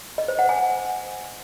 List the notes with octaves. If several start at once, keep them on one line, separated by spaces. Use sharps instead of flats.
D#5
C5
F#5
G#5